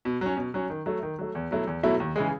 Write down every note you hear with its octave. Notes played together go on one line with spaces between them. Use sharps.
B2
F#3 C#4
B2
F#3 C#4
D#3
F#3 A3
D#3
F#3 A3
E2
B2 F#3 A3 E4
E2
B2 F#3 A3 E4
D#2
C#3 E3 G#3